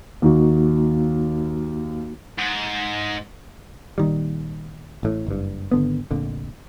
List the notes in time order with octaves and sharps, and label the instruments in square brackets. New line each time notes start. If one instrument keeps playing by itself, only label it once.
[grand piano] D#2 [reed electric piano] A#3 D#4 F#4
[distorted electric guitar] G#2
[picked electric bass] A#1 D#3 G3
A1 A2
F#1 G2
G#1 D3 B3
F1 A#1 F2 D3